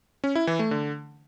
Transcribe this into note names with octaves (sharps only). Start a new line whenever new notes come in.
C#4
E4
E3
A3
D3